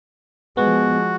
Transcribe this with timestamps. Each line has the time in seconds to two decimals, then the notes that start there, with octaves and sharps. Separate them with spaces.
0.57 F3 G#3 B3 F#4